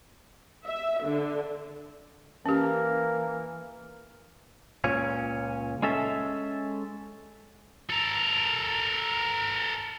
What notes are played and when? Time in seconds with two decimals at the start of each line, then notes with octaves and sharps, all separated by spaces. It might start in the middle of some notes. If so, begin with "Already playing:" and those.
0.65 E5
1.04 D3
2.46 E3 A#3 C#4 G4 A#4
4.84 C#2 A#2 C#4
5.82 G#3 C#4 A4 E5
7.90 A4 A#4